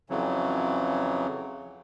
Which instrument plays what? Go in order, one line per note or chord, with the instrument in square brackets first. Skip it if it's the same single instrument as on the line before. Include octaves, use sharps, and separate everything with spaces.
[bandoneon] F2 C#3 E3 F#3